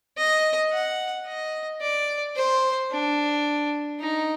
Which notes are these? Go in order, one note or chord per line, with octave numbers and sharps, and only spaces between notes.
D#5
F#5
D#5
D5
C5
D4
D#4